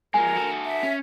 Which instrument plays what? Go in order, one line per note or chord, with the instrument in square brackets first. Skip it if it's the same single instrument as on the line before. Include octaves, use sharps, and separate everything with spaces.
[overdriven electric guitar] F3 G#3 [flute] A#4 [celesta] G#5
[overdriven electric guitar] F#4 A4
[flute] E5
[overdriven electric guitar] C#4